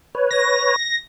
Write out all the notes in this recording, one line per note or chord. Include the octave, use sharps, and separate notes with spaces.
B4 C#5
A#6